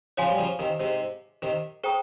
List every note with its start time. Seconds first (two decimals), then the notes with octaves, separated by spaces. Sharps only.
0.17 C#3 F3 C#5 F5 G#5 C6
0.30 G3
0.38 C#3 F3
0.59 C3 D#3
0.80 G#2 C3
1.42 C3 D#3
1.84 G#4 C5 G5 A#5 D#6